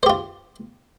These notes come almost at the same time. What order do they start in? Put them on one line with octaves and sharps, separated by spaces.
C5 G4 F4